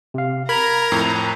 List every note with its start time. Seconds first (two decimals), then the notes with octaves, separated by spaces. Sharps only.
0.14 C3 F5
0.49 A#4 A#5 B5 G#6
0.92 F2 A2